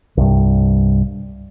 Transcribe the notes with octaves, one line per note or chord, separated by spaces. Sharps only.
C2 G2